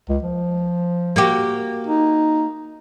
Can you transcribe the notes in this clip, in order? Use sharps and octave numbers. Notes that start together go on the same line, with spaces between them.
C#2
F3
A#3 F#4 G4
D#4